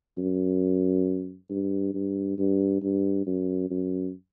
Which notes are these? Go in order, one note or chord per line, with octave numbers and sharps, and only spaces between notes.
F#2
G2
G2
G2
G2
F#2
F#2